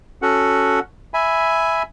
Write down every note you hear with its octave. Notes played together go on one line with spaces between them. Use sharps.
C#4 F#4 A4 F#5
E5 G#5 B5